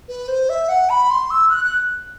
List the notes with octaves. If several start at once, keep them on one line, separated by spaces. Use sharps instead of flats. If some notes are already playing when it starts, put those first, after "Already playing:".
B4
C5
E5
F#5
B5
C6
E6
F#6
F#6